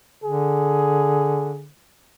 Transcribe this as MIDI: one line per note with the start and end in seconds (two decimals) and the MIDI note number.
0.24 1.69 50
0.24 1.64 68